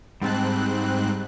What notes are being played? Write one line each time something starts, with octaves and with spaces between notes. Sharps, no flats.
G#2 G3 C4 A5 F#6